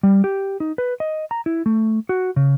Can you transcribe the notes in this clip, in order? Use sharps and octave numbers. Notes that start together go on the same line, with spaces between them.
G3
G4
D#4
B4
D#5
A#5
E4
A3
F#4
C#3